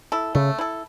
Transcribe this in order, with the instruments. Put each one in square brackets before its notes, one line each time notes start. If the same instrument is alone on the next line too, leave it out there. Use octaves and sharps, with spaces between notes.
[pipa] E4 A4
[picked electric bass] C#3 [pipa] A3
[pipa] E4 A4